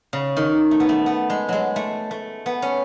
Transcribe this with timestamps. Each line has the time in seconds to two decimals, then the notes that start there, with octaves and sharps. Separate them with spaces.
0.13 C#3
0.37 D#3
0.71 A3
0.80 B3
0.89 A3
1.06 B3
1.30 G#3
1.49 F#3 G#3
1.76 A3
2.11 A3
2.46 B3
2.62 C#4